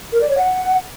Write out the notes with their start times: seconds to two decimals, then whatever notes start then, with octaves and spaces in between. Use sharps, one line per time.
0.12 A#4
0.21 D5
0.29 C#5
0.37 F#5